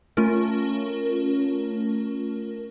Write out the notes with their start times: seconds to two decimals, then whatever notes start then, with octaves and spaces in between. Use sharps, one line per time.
0.17 A3 C#4 F4 A#4